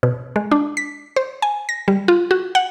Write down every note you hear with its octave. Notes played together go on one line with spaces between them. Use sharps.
B2
G#3
D4
B6
C5
G#5
A#6
G3
F4
F#4
F#5